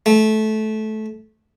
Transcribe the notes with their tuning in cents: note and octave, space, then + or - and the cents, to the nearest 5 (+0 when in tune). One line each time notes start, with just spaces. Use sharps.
A3 -20